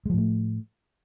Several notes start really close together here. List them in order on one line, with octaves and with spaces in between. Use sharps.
G#3 F3 A2 A3